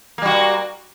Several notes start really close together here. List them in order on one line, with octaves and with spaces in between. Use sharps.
A#3 G3 F#4